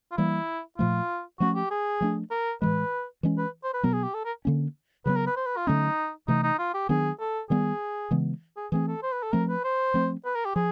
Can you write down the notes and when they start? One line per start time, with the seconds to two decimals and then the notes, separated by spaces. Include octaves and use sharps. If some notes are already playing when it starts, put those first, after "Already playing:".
0.12 F4
0.17 E3 G3 A#3 E4
0.78 A#2 F3 A3 F4
1.40 F3 A3 C#4 F#4
1.56 G4
1.71 G#4
2.01 F3 A3 D4
2.31 A#4
2.62 A2 E3 G#3 B4
3.23 E3 G#3 C#4
3.38 B4
3.64 C5
3.74 B4
3.83 B2 F#3 B3 A#4
3.94 G#4
4.04 G4
4.14 A4
4.25 A#4
4.45 D3 F3 A#3 C#4
5.06 C#3 F#3 B3 B4
5.16 A#4
5.27 B4
5.36 C5
5.47 B4
5.57 F4
5.67 D3 F#3 A3 C#4 D#4
6.28 C3 E3 A3 D#4
6.44 D#4
6.59 F4
6.74 G4
6.89 D#3 F#3 B3 D4 G#4
7.20 A4
7.50 D#3 G3 B3 G#4
8.11 C#3 E3 G#3 B3
8.57 G#4
8.72 E3 A3 C4 G#4
8.88 A4
9.03 C5
9.13 B4
9.23 A4
9.33 F3 A3 C4 A#4
9.49 B4
9.64 C5
9.94 F3 A3 C4
10.25 B4
10.35 A#4
10.46 G4
10.56 F3 G#4